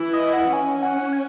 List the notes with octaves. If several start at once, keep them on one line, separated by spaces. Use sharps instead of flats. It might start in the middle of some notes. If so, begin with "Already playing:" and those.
Already playing: E3 E4
D#5
F#5
C#4 G#5
F#5
G#5